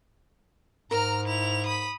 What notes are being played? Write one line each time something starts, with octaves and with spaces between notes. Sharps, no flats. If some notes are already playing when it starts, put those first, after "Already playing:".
G#2 A#4 A#5 F6
E4 F7
B5 D#6